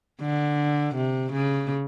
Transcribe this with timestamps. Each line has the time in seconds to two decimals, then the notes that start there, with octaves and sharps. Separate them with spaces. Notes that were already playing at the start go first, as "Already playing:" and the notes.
0.22 D3
0.96 C3
1.33 C#3